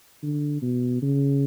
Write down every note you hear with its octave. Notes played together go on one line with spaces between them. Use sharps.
D3
B2
C#3